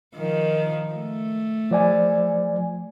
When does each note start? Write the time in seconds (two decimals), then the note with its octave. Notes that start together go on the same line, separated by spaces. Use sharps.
0.15 D#3 F3
0.94 A3
1.71 F3 D5 G#5